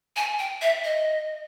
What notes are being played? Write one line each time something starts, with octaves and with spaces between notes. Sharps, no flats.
G#5
G5
E5
D#5